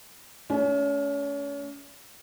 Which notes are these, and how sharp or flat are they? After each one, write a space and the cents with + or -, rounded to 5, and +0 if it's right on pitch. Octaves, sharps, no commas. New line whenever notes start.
A3 -15 C#4 +35